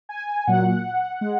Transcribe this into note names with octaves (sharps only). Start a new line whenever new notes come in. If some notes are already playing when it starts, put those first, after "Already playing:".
G#5
A#2 F#3 F#5
G#3